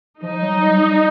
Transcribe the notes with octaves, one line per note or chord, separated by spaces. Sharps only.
F3 D#4
F#3
G3